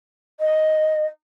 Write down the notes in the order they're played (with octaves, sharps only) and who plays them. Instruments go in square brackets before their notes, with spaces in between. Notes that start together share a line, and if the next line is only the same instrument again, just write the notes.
[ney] D#5